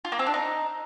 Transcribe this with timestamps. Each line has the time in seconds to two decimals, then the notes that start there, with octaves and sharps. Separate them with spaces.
0.05 F4
0.12 A#3
0.19 C4
0.26 D4
0.34 D#4